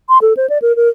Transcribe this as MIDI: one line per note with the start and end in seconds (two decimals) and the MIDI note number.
0.09 0.18 84
0.22 0.33 69
0.37 0.49 72
0.50 0.58 74
0.62 0.75 70
0.76 0.89 70